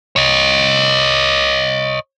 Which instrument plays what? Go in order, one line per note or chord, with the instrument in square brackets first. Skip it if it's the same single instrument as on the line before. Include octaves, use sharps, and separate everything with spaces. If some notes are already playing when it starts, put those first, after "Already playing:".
[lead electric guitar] C#5 D#5